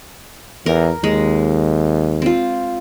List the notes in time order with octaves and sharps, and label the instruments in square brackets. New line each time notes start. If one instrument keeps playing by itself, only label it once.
[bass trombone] E2 [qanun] A#4
[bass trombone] D#2 [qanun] G#3
[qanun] C4 F4